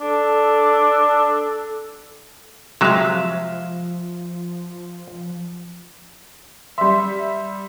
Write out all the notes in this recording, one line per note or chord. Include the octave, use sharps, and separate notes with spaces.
D4 A4
C3 F3 F#3 G#3 E5 F5
G3 E5 C6